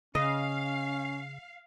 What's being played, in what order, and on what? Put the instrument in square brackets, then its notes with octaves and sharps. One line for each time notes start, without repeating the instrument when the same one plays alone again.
[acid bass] C#3 [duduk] C#4 [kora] D#5 [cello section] F5